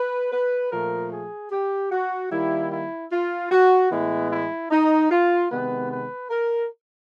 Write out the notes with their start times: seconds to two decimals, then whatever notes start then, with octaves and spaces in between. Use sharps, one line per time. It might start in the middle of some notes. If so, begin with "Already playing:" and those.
Already playing: B4
0.32 B4
0.71 A#2 F3 A3 A#4
1.12 G#4
1.51 G4
1.91 F#4
2.31 D#3 G3 A#3 E4
2.71 E4
3.12 F4
3.51 F#4
3.91 A2 E3 G#3 B3 E4
4.31 E4
4.71 D#4
5.10 F4
5.50 C3 D#3 G#3 B3 B4
5.91 B4
6.30 A#4